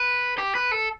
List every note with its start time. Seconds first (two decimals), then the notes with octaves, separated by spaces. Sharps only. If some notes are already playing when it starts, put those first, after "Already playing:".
Already playing: B4
0.38 G4
0.55 B4
0.72 A4